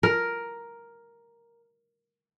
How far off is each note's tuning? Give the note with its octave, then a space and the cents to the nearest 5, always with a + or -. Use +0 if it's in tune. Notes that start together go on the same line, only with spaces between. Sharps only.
A#4 +5